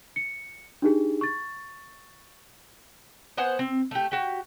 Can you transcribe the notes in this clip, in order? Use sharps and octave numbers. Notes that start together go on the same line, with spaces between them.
C#7
D4 D#4 G4 G#4
C#6 A6
B3 C5 F#5 G#5
C4
A3 G4
F#4 G4